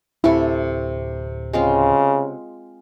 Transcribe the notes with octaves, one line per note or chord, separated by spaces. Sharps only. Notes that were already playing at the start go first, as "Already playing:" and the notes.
D1 C3 E4 A4 C#6
C#3 G#3 C4 F4